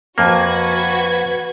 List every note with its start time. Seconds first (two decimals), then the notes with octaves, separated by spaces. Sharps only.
0.18 F2 A#3 F#4 B4 G#6